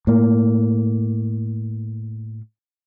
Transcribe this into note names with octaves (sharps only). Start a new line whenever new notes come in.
A2 A#3